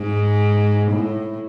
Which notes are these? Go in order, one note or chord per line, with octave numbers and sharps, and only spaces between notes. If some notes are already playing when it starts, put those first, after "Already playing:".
Already playing: G#2
A2